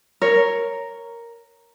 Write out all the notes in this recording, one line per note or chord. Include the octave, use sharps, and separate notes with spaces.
A#4 C#5